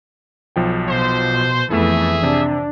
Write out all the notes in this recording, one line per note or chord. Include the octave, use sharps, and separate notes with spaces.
B1 F3 G5
B2 C5
F2 E3 A3 B3 E4 G#4 E5
C3 D4